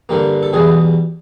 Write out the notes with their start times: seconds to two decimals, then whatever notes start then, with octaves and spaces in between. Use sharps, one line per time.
0.09 G2 D3 G3 A#3
0.43 A4
0.53 E2 B2 G3 G#4